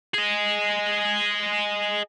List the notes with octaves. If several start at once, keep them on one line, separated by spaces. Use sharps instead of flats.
G#4 D#5